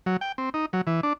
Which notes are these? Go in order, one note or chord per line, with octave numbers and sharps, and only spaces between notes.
F#3
G5
C4
D#4
F#3
E3
D4